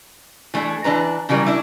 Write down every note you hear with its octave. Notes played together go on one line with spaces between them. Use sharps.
E3 A3 D4 G#4
E3 D4 B4 A#5
C#3 E3 F#3 G3 A#4
D4 E4